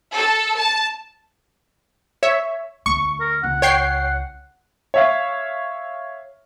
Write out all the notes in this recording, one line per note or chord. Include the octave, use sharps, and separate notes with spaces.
A4
A5
C#5 E5
D2 C#6
A#4
C#2 F#5
C#5 G5 C7
C#5 E5 F5